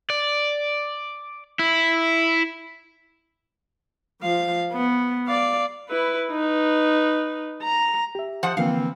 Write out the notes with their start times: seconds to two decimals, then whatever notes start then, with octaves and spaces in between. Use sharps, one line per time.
0.10 D5
1.59 E4
4.22 F3 F5
4.73 B3
5.27 D5 F5
5.89 E4 B4
6.30 D#4 B4
7.63 A#5
8.15 G4 E5
8.43 F3 C5 F#5
8.57 D3 E3 F3 A#3 C4 F5